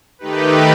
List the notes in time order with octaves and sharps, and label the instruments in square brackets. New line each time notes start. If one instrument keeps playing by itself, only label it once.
[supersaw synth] D#3 A3 D#4 G4 B4